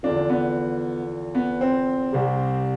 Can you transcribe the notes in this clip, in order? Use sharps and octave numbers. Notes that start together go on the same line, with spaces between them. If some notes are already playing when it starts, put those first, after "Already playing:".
E2 D3 F3 D4
B3
B3
C4
C2 C3 G3